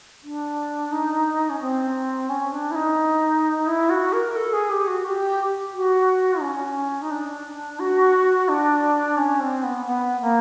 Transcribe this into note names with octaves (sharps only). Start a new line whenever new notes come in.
D4
D#4
C#4
C4
C#4
D4
E4
D#4
E4
F#4
A#4
A4
G#4
G4
F#4
G4
F#4
C#4
D#4
D4
F#4
D4
C#4
C4
B3
B3
A#3